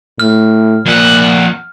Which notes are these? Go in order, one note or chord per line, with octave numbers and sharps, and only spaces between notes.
A2 F6
F2 A#2 F#5